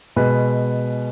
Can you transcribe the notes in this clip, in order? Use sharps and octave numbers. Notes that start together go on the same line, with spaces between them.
B2 G#3 B4